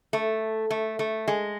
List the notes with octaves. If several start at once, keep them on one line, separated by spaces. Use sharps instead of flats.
A3
A3
A3
G#3